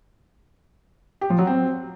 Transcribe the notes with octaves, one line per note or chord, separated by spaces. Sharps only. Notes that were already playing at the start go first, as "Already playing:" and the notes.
G4
F3
F#3
C4